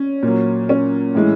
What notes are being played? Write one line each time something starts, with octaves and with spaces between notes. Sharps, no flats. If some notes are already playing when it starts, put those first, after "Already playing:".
Already playing: C#4
A#2
F#3
C#4
A2 E3 G#3